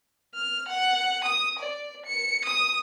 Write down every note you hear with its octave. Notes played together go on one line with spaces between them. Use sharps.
F6
F#5
D#6
D5
C#7
D#6